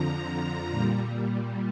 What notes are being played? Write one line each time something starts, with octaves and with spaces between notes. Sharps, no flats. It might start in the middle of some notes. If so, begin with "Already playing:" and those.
Already playing: F2 D3 F3 A#5
A#2 G3